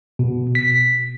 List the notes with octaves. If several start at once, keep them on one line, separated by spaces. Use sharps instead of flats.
B2
B6